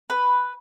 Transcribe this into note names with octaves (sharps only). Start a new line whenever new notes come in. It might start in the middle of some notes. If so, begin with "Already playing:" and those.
B4